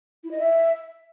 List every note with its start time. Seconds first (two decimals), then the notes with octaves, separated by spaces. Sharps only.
0.24 E4
0.31 D#5
0.39 E5